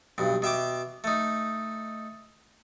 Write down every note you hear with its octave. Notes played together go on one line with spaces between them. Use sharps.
B1 G2
B2 E5 G5 D6
A3 D#4